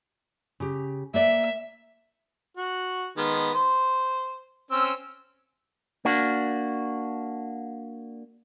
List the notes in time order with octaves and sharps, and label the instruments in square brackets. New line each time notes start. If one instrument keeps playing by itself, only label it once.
[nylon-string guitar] C#3 G4
[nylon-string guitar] A#3 B4 D5 [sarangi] E5
[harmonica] F#4
D#3 G#3 B3
C5
C4 C#4 E6
[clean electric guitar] A#3 D4 F#4